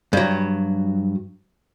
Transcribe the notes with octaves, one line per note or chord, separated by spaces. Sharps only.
G2 F#3